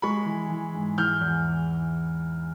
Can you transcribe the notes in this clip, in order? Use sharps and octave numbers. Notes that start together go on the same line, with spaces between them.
G#3 B5 C#6
E3
E3
G#2
E3 F6 G6
E2